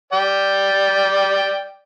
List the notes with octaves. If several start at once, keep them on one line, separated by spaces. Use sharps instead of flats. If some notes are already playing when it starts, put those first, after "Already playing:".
D5 G5